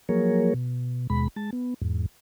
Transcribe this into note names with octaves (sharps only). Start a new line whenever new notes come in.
F3 F#3 A#3 G#4 A#4 C#5
B2
D#2 B2 G#3 B5
G#3 A5
B3
E2 G#2